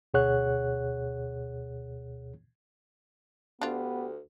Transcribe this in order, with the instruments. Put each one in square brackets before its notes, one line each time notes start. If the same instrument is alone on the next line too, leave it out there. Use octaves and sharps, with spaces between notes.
[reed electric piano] D2 B2 G#4 C#5 F#5 F#6
[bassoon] D2 [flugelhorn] B3 [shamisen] D4 F4 [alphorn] G4